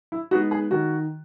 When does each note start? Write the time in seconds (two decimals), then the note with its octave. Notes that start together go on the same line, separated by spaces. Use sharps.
0.12 E4
0.31 G#3 B3 D#4 F#4
0.51 G#4
0.71 D#3 F#4